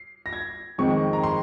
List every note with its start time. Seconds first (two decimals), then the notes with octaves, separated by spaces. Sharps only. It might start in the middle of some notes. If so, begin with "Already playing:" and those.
Already playing: C7
0.26 A#6
0.33 G#6
0.78 F2 D#3 G#3 C4 C#6
1.13 A#5
1.24 C6